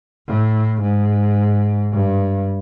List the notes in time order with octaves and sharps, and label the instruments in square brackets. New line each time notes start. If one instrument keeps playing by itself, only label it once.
[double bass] A2
G#2
G2